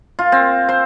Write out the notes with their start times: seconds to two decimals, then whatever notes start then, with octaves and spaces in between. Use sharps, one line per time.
0.19 F4
0.32 C4
0.69 C5